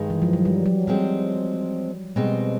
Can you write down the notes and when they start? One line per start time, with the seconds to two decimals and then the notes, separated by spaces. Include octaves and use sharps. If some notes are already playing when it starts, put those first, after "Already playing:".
Already playing: G2 D#3 G#3
0.10 E3
0.22 F3
0.33 F#3
0.45 G3
0.66 F#3
0.87 F3 G3 G#3 C4
2.16 B2 G3 G#3 C4